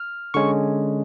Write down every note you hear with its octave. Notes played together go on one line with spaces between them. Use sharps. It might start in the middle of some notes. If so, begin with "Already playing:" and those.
Already playing: F6
D3 G#3 C#4 C#6